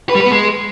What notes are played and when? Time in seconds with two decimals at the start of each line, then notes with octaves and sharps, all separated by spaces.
0.09 B4
0.15 G3
0.20 B4
0.26 B3
0.31 G#3